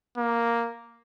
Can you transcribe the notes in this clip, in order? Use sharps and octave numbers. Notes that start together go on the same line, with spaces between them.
A#3